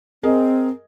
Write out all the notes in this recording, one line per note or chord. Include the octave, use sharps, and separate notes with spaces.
C4 G#4 A#4 D#5